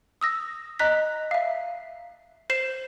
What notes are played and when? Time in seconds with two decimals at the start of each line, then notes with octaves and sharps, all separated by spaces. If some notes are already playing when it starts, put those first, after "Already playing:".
0.21 D#6 E6 A#6
0.79 D#5 A#5 F#6 B6
1.31 E5 F5
2.50 C5 C7 E7